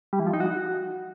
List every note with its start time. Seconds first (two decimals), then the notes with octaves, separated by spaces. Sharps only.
0.13 G3
0.20 E3
0.27 F3
0.33 D#4
0.40 F#4